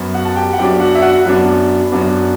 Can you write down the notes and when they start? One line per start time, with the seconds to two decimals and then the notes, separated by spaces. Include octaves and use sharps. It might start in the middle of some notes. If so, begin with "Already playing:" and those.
Already playing: F#2 F#3 B3
0.14 F#4 F#5
0.25 A5
0.36 G4 G5
0.53 F#5
0.58 F#2 F#3 B3 D4 G4 G5
0.80 F#4 F#5
0.95 E5
1.02 F#4 F#5
1.25 F#2 F#3 B3 D4
1.91 F#2 F#3 B3 D4